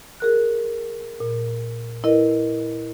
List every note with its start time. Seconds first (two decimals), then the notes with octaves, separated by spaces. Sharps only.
0.20 G#4 A#4 F#6
1.20 A#2
2.04 E4 A#4 B4 D#5